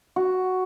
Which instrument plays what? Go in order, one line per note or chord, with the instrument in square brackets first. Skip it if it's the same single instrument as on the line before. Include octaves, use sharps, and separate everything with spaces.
[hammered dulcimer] F#4